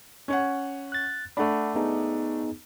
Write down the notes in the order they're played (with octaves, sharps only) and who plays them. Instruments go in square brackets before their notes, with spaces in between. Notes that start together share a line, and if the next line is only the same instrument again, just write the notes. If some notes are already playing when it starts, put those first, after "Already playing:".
[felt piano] C#4 C#5 F#5
[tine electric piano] F#6 A6
[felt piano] A3 D4 [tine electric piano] F#5 B5
[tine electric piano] B3 D#4 G#4